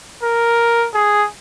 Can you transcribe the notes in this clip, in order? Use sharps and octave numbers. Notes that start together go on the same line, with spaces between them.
A#4
G#4